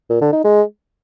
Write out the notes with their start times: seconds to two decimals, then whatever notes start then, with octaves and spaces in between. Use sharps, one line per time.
0.10 A#2
0.21 D3
0.33 D#4
0.44 G#3